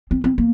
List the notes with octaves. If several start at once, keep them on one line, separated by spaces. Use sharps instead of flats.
C4
C4
A#3